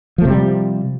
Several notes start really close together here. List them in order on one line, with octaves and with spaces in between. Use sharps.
F3 A3 C3 G3